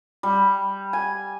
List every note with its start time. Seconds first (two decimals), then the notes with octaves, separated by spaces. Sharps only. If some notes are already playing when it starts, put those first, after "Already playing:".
0.23 G3
0.93 G#5